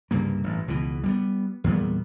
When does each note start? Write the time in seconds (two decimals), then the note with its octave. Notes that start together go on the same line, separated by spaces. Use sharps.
0.11 C2 G2 C#3 A#3
0.44 A1 G2
0.68 C#2 B2 E3
1.04 G3 A3 B3
1.64 E2 A#2 G3 B3